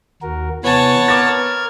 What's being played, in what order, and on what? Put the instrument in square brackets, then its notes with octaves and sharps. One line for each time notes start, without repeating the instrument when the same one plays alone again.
[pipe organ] D#2 F#4 A#4
[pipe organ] C3 E3 G#5 [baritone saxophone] B3 [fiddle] C#5 A5
[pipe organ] A#4 F6 G#6 [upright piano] D6 A6